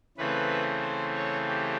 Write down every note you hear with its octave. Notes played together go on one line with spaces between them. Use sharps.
C#3 E3 A3 C4 B4
C5
C#5
G4